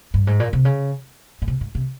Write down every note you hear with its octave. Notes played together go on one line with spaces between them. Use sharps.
G2
G#2
A#2
C3
C#3
A#2
C3
G#2
C3